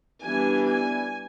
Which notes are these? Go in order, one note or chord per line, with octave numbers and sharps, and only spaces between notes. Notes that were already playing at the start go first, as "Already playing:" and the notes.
E3 G3 B3 D4 G#5
G#5